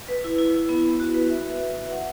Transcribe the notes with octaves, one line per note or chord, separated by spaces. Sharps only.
B4
E4
E4
E4
B3
B3
F#4
B4
E5
E5
E5
E5
F#5